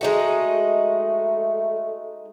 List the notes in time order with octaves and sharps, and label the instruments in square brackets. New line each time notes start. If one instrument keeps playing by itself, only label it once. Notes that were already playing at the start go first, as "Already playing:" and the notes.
[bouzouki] G#3 D#4 F#4 [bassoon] A3